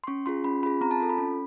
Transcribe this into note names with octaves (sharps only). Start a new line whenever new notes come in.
C6
C#4 C#6
F4 G#4 C6
C#4 B5
F4 G#4 B5
C4 A#5
A5
F4 A4
B5
C#4